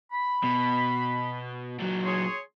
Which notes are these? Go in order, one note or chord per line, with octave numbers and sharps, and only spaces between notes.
B5
B2
A#2 F#3
G#4 C#5 C6